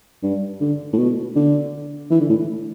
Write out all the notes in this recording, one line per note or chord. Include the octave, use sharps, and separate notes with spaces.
G2
D3
A2
B2
D3
E3
D3
A2